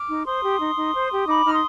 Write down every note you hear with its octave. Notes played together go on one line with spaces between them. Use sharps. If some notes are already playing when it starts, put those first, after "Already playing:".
Already playing: D6 F6
D#4
C5 C6 D#6
G4
D#4
D#4
C5
G4
D#4 B5 D6
D#4 F6
C6 D#6